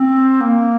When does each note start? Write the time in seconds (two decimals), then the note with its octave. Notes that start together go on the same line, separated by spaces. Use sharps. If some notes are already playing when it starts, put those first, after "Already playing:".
Already playing: C4
0.41 A#3